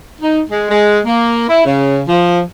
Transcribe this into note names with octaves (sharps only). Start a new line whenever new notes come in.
D#4
G#3
G#3
A#3
E4
C#3
F3